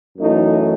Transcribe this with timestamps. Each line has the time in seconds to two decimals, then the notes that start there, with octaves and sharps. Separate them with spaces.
0.18 F#2 E3 A3 D#4